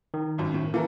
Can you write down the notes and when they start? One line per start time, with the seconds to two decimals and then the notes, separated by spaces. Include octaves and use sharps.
0.14 D#3
0.38 G#1 F#2
0.54 A2
0.74 E3 A#3 A4 A#4